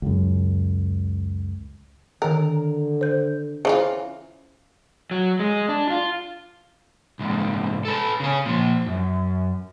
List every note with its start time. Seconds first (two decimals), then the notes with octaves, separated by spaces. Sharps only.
0.02 C#2 F#2
2.22 D3 D#3 A#4 A#5
3.01 C5 G6
3.65 C#3 E3 F4 C5
5.11 F#3
5.40 G#3
5.69 D4
5.90 F4
7.19 C2 G#2
7.85 A4 B4
8.20 C#3 C#4
8.45 A#2 F3
8.87 F#2